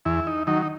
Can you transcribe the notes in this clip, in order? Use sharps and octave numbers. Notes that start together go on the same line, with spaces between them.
E2 E4
D#4
D#3 F#3 D#4
D#4